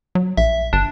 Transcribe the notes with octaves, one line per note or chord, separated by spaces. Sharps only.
F#3
A#1 E5
G1 D4